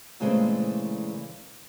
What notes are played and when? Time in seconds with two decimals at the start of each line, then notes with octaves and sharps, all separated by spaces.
0.20 A#2 C#3 E3 G#3 A3 C4